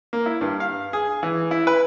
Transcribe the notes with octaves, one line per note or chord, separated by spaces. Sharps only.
A#3
E4
G2
F5
G#4
E3
E4
B4